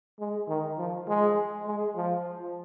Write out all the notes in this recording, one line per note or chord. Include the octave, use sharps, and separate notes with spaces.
G#3
D#3
F3
G#3
G#3
F3